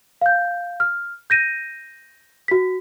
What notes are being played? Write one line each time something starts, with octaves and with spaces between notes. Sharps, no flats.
F5 G6
F6
G6 A#6 D#7
F#4 B6